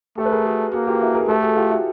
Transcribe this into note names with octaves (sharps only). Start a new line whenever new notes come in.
A3 G4 A4
B4
G#4 A#4
F#4 G#4
A#3 F#4 G#4
F4 G4
E4 F#4
G#4 A#4
A3 G4 A4
F#4 G#4
F4 G4
E4 F#4